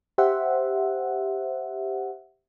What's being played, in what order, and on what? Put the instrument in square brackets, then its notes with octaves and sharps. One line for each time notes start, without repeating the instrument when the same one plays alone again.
[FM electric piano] G4 C5 E5 F#5